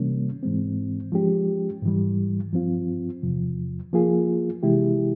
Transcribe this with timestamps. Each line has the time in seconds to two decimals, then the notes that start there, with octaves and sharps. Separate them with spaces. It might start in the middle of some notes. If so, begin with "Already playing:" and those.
Already playing: C3 E3 G3 A#3 C#4
0.43 G#2 E3 G#3 C4
1.12 F3 G#3 C#4 G4
1.83 G#2 E3 G3
2.53 G2 F3 C4 F4
3.23 E2 C3 F3
3.93 F3 A#3 F4 G#4
4.63 C3 E3 G#3 E4 G4